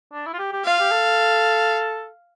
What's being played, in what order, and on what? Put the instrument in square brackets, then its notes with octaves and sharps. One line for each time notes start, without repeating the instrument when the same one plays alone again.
[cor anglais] D4
E4
F4
G4
G4
[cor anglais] F4 [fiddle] F5
[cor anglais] G4
A4